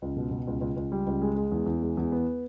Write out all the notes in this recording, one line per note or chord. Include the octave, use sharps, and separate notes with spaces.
C#2
B2
B2
C#2
C#2
C#2
G3
C#2
G#3
G#3
E2
E2
G#3
E2
B3